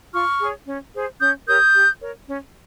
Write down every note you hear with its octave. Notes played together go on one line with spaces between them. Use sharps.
F4 C#6 F6
G#4 C#5
C#4
G#4 C5
C#4 D#6 G6
G4 A#4 C#5 D#6 G6
G4
A#4 C#5
C#4